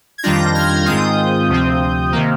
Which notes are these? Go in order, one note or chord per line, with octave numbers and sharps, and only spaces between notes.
G#6
F2 D#3 G3 D4 F4 G6 A#6
F6 G#6
G#2 D#3 G#3 C4 F4 D#6 G6
D2 C3 F3 C4
C3 D#3 A#3